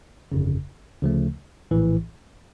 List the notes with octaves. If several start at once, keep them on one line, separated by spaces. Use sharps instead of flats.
G1 F2 C#3
D2 C#3 F3 A3
A#1 A2 E3